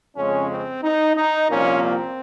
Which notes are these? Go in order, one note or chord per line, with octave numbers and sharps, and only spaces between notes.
F2 C#3 G#3 C#4
C4
D#4
D#4
C2 A#2 F3 A#3 C#4
C4